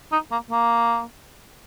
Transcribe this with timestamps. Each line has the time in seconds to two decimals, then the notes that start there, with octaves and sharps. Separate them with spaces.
0.12 D#4
0.32 A#3
0.51 A#3